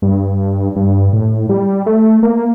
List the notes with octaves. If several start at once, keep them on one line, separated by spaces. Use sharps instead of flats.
G2
G2
A2
G3
A3
A#3